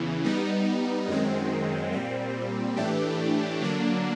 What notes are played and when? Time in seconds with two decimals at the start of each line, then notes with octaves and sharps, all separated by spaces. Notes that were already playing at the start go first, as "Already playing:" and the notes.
Already playing: E2 C#3 E3
0.24 G3 B3 D#4
1.08 F#2 D#3 G#3 C4
1.93 A#2 G3 C4
2.77 A2 E3 A3 D4 G4
3.61 D3 F#3 A#3 D4